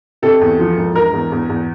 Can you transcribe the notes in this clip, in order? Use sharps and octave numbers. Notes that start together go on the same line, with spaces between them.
C3 A4
E2
F3
E1
E1 A#4
E2
E2
E2